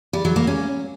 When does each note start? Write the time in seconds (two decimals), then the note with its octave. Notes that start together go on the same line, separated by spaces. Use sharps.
0.13 G3
0.25 F#3
0.36 A#3
0.47 C#4